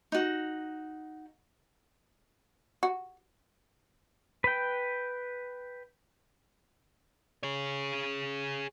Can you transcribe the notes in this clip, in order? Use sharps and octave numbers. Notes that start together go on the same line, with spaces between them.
D#4 F#4
F#4
B4 G5
G#4 C#5